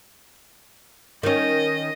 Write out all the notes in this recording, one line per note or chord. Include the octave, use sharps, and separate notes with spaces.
D#3 C#4 D#5